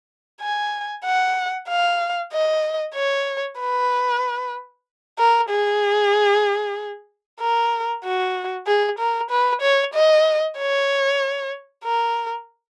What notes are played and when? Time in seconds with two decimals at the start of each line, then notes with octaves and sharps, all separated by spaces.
0.41 G#5
1.05 F#5
1.69 F5
2.33 D#5
2.95 C#5
3.59 B4
5.19 A#4
5.50 G#4
7.40 A#4
8.04 F#4
8.67 G#4
8.99 A#4
9.31 B4
9.62 C#5
9.94 D#5
10.58 C#5
11.85 A#4